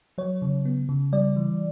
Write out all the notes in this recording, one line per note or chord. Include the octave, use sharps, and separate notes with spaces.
F#3 C#5
C#3
B3
C#3
G3 D5
E3